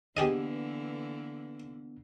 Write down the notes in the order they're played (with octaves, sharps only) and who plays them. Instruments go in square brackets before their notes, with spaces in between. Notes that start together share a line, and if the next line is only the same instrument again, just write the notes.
[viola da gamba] D3 E3 A#3 [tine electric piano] B3 D4 [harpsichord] G4 G#4 D#5